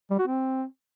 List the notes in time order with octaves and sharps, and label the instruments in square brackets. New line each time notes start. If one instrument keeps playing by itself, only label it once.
[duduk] G3
F#4
C4